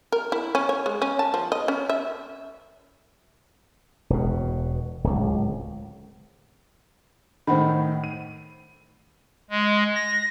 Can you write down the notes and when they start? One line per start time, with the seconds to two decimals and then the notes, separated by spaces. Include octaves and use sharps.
0.12 A#4
0.32 E4
0.55 C#4
0.69 C#5
0.86 G#3
1.02 C#4
1.19 A5
1.34 F3
1.52 D#5
1.68 C#4
1.89 E5
4.10 E1 B2
5.04 D1 C#2
7.47 A2 D#3 C5 F#5 B5
8.04 D#7
9.50 G#3
9.96 A#6